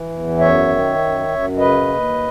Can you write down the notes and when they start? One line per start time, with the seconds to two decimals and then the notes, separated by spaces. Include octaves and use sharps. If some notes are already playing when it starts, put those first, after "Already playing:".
Already playing: E3
0.09 E2
0.39 F#2 C#5 E5
0.69 D#3
0.98 F#2
1.28 F#2
1.57 C#3 B4 D#5
1.87 D#2